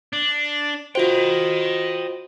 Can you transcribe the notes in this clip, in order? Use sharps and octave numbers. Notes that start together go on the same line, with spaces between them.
D4
F4 F#4 C5 D#5 G5